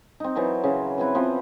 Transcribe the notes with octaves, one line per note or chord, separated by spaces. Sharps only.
C4 D#4
E3 F#3 C4 A#4
C#3
E3 C4 E4 B4
F3 B3 C4